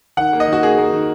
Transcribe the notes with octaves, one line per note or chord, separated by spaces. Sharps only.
D#3 F#5
A#3
D#5
D#3
F#4
A#3 G#4
A#3
D#3